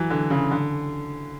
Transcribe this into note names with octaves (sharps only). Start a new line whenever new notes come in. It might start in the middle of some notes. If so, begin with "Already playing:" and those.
Already playing: E3 F#3
D3
C#3
D3